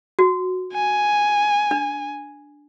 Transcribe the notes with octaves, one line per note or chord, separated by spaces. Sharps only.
F#4
G#5
D4